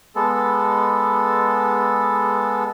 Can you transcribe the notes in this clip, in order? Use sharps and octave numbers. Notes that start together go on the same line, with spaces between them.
G#3 B3 A4